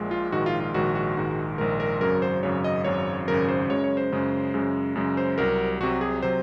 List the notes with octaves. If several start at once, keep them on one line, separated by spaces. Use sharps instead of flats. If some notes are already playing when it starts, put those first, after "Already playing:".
Already playing: A#1 A#2 G#3
F4
A#1 G#2 D#3 G#3 F#4
F4
F4
A#1 G#2 D#3 G#3 F#4
F#4
A#1 G#2 D#3 G#3
A#1 G#2 D#3 G#3 A#4
A#4
G#1 F#2 C#3 F#3 A#4
C5
G#1 F#2 C#3 F#3 C#5
D#5
G#1 F#2 C#3 F#3 C#5
G#1 F#2 C#3 F#3 A#4
C5
F#2 C#3 G#3 C#5
C#5
C5
F#2 C#3 G#3
F#2 C#3 G#3
F#2 C#3 G#3
C5
C2 C3 F#3 A#4
C2 C3 F#3 F#4
G#4
C3 F#3 C5